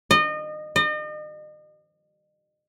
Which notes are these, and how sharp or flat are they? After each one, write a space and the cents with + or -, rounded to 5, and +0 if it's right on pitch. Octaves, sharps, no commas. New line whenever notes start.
D#5 -30
D#5 -40